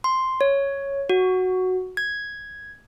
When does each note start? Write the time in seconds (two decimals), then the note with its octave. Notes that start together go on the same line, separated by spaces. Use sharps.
0.04 C6
0.41 C#5
1.09 F#4
1.97 G#6